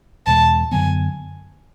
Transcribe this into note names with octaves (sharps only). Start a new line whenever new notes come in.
E2 B2 G#3 A5
F#2 D3 F#3 B3 G#5